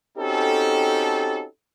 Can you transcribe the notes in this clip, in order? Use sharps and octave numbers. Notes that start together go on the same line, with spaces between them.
C4 C#4 D#4 F#4 G4 A4